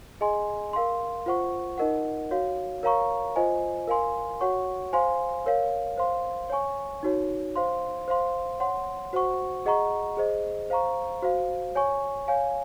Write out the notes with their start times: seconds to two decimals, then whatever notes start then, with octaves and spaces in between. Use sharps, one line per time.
0.21 G#4 D#5 G#5 C6
0.73 A#4 F5 C6
1.26 F4 C5 F#5 C#6
1.78 D#4 A#4 D#5 F#5
2.31 F#4 C#5 F5
2.83 A#4 C#5 F5 A#5 C#6
3.36 F4 C5 D#5 G#5
3.87 A#4 F5 G#5 C6
4.41 F#4 C#5 F#5 C#6
4.93 C5 F5 G#5 C6
5.46 A#4 C#5 F5
5.98 C5 F5 C6
6.50 C#5 G#5 C#6
7.03 D#4 F#4 C#5
7.56 C5 F5 C6
8.08 C5 F5 C6
8.60 C#5 F#5 C6
9.13 F#4 C5 F#5 C#6
9.66 G#4 D#5 F#5 A#5 C#6
10.17 G#4 C5 D#5
10.70 C5 F5 A#5 C#6
11.22 F#4 C5 F5
11.76 C#5 G#5 C#6
12.28 C#5 F5 G#5